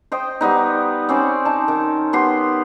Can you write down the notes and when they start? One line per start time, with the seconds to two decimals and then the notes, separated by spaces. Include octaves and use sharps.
0.12 C5 D#5 G5
0.41 G3 B3 D#4
1.09 C4 C#4 C5 D5
1.45 D#4 A5
1.68 D#3
2.13 B3 G4 C6